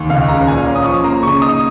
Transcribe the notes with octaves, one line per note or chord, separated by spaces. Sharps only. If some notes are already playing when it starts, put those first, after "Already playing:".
Already playing: D#2
C#2 F5
C#3 A#5
A#2 G#5
F5
C#4 A#5
D#6
F3 C#6
A#3 A#5
C#3 C#6
D#4 D#6